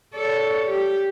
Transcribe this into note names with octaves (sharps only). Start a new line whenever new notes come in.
A4 C#5 D5
G4